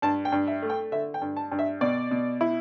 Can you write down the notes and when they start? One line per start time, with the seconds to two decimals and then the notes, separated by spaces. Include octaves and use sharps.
0.02 G2 A5
0.25 G5
0.32 G2
0.47 E5
0.62 A3
0.70 G5
0.92 D3 E5
1.14 G5
1.22 G2
1.37 A5
1.52 G2
1.59 E5
1.81 B2 D5
2.11 B2
2.41 E4